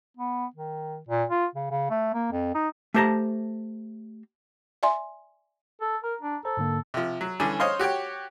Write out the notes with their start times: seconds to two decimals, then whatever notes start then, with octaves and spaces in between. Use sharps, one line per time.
0.17 B3
0.56 D#3
1.09 A#2
1.30 F4
1.55 C#3
1.71 C#3
1.90 A3
2.14 A#3
2.32 F2
2.55 D#4
2.94 A3 G4 C5 A5 A#5
4.83 D5 E5 G#5 C6
5.81 A4
6.04 A#4 A#5
6.21 D4
6.45 A4 C5 A#5
6.57 G#2 D3 A#3
6.94 C3 F3
7.21 F#3
7.40 D3 E3 G3 C#4 D4
7.60 C5 C#5 D#5 F5 C6
7.79 F#4 G4 C#5 G5